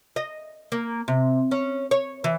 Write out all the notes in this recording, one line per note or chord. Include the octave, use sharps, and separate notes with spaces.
D#5
A#3
C3
C#4
C#5
E3